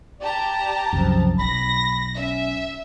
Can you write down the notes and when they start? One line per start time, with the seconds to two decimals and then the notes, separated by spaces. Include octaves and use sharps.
0.21 G4 D5 A5 A#5
0.93 F#1 C2 F#2 F3
1.39 B1 B5 A#6
2.16 C#4 E5